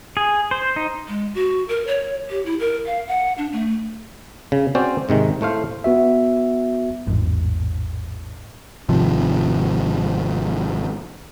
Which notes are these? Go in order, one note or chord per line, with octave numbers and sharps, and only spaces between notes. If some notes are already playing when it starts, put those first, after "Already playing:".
G#4
C5
D#4
G#3
F#4
A#4
C#5
G4
E4
A#4
F5
F#5
D4
A3
C#3
C4 C#4 F#4 C5 D5
G#2 C3 D#3 G#3
A2 A3 C5 F5
B3 F#4 E5
A1 E2 G#2
G#1 C3 F3